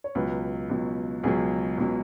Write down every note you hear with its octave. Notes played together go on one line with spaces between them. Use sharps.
C#5
C#2 B2 F#3 B4
C#2 B2 F#3
C#2 B2 F#3 G#4
C#2 B2 F#3